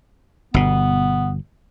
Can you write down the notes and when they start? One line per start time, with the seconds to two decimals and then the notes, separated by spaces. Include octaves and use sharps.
0.54 G1 B2 B3